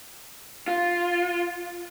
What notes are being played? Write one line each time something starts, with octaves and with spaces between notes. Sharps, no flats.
F4